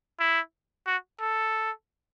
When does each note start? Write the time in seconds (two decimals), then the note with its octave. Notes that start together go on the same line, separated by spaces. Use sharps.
0.20 E4
0.87 F#4
1.21 A4